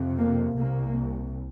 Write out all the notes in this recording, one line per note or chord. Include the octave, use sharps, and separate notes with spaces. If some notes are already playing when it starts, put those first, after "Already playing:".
Already playing: F2 C3
A#3
C2 C3 A#3